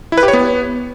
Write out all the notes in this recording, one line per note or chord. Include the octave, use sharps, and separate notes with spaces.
E4
B4
G4
C#5
B3